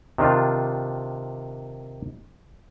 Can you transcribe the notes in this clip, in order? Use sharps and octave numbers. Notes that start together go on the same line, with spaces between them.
C3 D#3 D4 F4